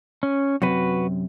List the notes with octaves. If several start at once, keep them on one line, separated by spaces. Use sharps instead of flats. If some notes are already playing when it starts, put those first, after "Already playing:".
C#4
F#2 C3 F#4 B4